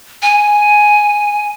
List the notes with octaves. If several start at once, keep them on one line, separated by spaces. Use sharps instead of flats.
G#5